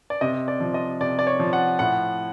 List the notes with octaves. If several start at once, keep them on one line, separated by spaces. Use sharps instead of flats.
D5
C3 D#5
D5
F3
D#5
C3 D5
D5
C#5
F3
F#5
A2 F#5